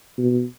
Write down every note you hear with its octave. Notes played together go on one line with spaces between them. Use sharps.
B2